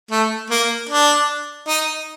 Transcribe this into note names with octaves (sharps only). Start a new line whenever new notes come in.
A3
A#3
D4
D#4